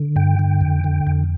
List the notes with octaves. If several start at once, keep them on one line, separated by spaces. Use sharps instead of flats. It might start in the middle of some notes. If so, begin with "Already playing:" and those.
Already playing: D3
G2 G5
D3
F2
D3
F2